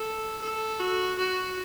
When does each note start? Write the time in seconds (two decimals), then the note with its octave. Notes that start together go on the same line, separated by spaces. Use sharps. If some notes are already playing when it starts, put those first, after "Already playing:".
Already playing: A4
0.42 A4
0.80 F#4
1.18 F#4